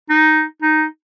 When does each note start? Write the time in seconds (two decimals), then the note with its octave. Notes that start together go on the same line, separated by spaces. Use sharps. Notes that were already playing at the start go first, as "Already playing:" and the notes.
0.10 D#4
0.62 D#4